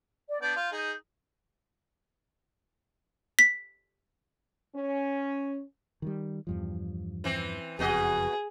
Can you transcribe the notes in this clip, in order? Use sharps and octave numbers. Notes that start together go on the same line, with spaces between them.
D5
B3 D4 D5 G6
F4
D#4 G#4
B6
C#4
D#3 E3 G3
E2 G2 F3
E3 C4
F#1 F2 B2 F#4 G#4 D#5